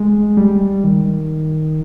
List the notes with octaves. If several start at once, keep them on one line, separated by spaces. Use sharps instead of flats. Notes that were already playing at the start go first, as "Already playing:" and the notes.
Already playing: G#3
G3
D#3